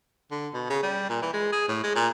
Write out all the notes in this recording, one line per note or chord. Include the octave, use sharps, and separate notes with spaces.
D3
B2
C#3
G3
A#2
E3
G#3
G#4
A2
G#3
A#2